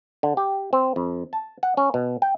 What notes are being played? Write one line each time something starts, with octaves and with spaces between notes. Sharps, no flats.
D3
G4
C4
F2
A5
F#5
C#4
B2
G5